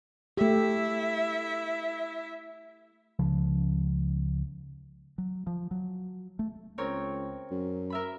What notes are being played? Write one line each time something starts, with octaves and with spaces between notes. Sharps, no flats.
A3 E4 G4 E5
C#2 C#3 F3
F#3
F3
F#3
A3
C#2 C4 A#4 C#5
F#2
A#4 E5 B5